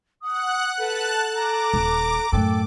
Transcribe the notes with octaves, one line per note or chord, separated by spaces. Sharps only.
F#5 D#6 F#6
A4 B4 A5 F#6
A#5 D6
D#1
F#2 A2 A4 G5